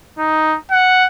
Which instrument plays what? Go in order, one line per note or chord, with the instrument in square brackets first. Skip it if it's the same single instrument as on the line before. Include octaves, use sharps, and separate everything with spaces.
[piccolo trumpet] D#4
F#5